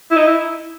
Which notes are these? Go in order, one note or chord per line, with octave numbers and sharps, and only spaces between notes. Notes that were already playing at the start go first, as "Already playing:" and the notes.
E4
D#4
E4